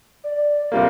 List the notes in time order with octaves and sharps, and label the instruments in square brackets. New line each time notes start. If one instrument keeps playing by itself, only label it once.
[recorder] D5
[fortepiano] C3 G3 A#3 [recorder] F5